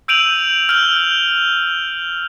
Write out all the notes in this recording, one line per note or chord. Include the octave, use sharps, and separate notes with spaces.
E6 G6 D7 D#7 F7 F#7
F6 G6 F7